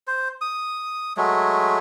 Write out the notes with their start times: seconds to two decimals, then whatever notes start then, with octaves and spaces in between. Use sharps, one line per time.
0.07 C5
0.41 D#6
1.17 F#3 G#3 A3